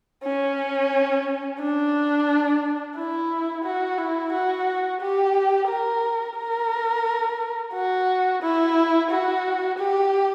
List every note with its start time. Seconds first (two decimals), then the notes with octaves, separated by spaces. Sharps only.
0.24 C#4
1.60 D4
2.96 E4
3.64 F#4
3.98 E4
4.33 F#4
5.01 G4
5.69 A#4
6.37 A#4
7.74 F#4
8.42 E4
9.10 F#4
9.78 G4